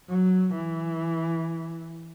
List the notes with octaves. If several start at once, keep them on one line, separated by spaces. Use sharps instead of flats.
F#3
E3